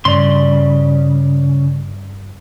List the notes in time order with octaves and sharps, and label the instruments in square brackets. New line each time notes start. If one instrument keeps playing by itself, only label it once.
[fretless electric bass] G2 [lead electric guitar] C#3 [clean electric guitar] D5 C6